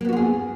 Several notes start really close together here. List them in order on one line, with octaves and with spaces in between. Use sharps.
A#3 B3 F#4 F4 G#4